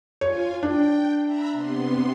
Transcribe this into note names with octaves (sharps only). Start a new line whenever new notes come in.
F4 C#5 G#5
D4 G5
E5 A#5 B5
C3 B3 C6